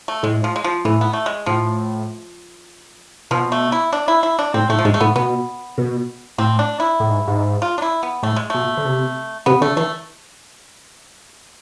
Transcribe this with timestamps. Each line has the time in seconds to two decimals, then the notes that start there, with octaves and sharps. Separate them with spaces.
0.08 A3
0.23 A2 G#3
0.44 F3
0.56 G#3
0.64 F3
0.85 A2 E3
1.01 B3
1.13 A3
1.26 G#3
1.46 A2 F3
3.31 B2 F3
3.52 A3
3.72 E4
3.93 D4
4.08 E4
4.23 E4
4.39 D4
4.54 A2 C4
4.69 A2 A3
4.79 F3
4.85 G#2 G#3
4.94 A3
5.01 A2 B3
5.16 B2 B3
5.78 B2
6.38 A2 C4
6.59 D4
6.80 E4
7.00 A2
7.09 G#2
7.28 G#2
7.62 F4
7.78 D4
7.82 E4
8.03 B3
8.23 A2 A3
8.36 G#3
8.50 B2 A3
8.77 D3
8.85 C3
9.46 C3 B3
9.61 D3 A3
9.76 E3 A3